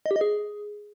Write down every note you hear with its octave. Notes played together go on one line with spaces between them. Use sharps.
D#5
G4
D#5
G#4